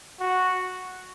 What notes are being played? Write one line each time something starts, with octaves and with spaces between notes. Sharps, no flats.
F#4